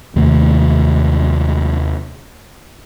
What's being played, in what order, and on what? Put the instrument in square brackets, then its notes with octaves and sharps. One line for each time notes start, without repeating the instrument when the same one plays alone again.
[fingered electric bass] D#2 C3 D#3 A3